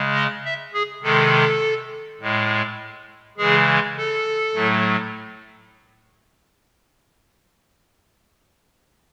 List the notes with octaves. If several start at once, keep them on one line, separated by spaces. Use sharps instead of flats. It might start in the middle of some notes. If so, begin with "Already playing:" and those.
Already playing: C#3 G#3
D#5
E5
G#4
C3 D#3 G#3 A4
A2 G#3
C#3 E3 G#3 G#4
A4
A2 F#3 A3